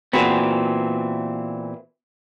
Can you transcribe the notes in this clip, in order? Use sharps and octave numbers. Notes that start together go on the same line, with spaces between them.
A#2 E3 B3 C4 F#4 G#4